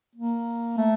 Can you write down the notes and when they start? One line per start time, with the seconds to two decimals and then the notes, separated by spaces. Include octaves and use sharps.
0.15 A#3
0.77 A3